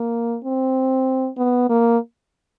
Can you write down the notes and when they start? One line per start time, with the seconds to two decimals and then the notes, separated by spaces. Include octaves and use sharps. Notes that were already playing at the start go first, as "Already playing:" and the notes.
Already playing: A#3
0.44 C4
1.38 B3
1.70 A#3